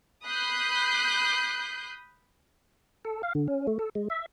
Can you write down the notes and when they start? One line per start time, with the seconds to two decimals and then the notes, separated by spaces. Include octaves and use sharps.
0.24 B5 D#6 F#6 G6 C7
3.05 A4
3.23 F5
3.35 D3
3.48 C#4
3.67 A3
3.79 A4
3.95 G#3
4.10 E5